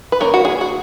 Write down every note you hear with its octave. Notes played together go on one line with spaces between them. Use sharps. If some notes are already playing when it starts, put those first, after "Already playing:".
B4
D#3 A#3 C#4 A#4
F#4
G#4
F#4